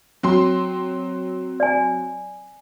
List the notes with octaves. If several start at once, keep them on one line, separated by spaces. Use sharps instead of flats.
F#3 C4 C6
D5 G#5